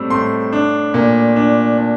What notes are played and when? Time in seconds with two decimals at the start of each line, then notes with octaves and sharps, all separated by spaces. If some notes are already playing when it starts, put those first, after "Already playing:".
Already playing: A2 G3 C4 E6
0.10 A2 C6
0.53 D4
0.94 A#2
1.36 D4
1.77 D4